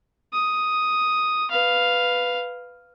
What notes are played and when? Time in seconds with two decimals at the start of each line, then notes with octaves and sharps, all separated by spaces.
0.33 D#6
1.51 B4 F5